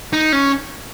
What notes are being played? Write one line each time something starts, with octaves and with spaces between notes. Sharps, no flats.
D#4
C#4